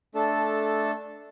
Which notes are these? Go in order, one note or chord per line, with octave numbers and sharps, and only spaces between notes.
A3 D4 A4 A5